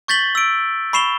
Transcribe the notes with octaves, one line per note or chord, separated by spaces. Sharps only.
C#6 G6 A6 B6 F#7 G7
E6 D7
B5 C#6 C7 E7 F7 G7